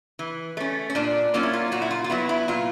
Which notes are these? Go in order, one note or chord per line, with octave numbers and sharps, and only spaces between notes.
E3
A3 C#4
C#4
A#2 D4
F#3 A#3 C#4 F4
E4
F4
A#2 F#4
E4
F4
F4
F#3 B3 E4
E4
A#2 F4